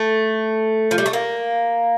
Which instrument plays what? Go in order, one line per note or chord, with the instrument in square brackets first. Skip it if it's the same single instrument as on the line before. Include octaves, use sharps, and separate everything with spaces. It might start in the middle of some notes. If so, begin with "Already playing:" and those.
Already playing: [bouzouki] A3
F3
G3
A3
A#3